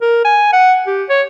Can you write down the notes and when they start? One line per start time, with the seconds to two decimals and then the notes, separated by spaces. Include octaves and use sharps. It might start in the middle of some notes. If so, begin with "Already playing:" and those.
0.01 A#4
0.25 G#5
0.53 F#5
0.87 G4
1.09 C#5